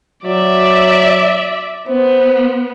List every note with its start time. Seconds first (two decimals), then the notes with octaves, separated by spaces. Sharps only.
0.25 F#3 D5 E5
1.88 B3 C5